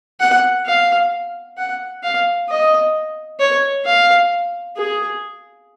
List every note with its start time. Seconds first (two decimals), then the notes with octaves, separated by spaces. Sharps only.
0.20 F#5
0.66 F5
1.58 F#5
2.03 F5
2.49 D#5
3.40 C#5
3.86 F5
4.77 G#4